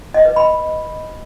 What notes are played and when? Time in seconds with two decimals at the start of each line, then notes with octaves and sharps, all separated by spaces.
0.14 D#5
0.25 B4
0.36 B5